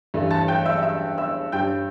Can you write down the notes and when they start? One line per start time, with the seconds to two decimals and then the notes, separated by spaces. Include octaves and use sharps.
0.14 G2 E3 A3
0.31 A5 A6
0.48 G5 G6
0.66 E5 E6
0.83 E5 E6
1.18 E5 E6
1.52 G2 G3 D4 G5 G6